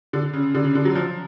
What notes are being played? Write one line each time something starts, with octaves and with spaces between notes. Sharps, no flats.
D3
C#3
D3
C#3
D3
F#3
F3